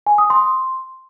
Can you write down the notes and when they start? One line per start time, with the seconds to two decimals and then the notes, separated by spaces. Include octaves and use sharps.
0.07 G#5
0.18 D#6
0.30 C6